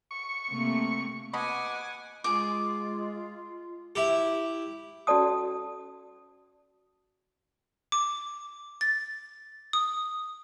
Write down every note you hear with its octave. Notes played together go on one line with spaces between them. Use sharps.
C#6
C3 A3 A#3
B2 D#5 F#5 G#5 B5 D6
G#3 F4 G#4 D6
E4 G4
C#4 F#4 A4 D5 A5 D#6
D6
A6
D#6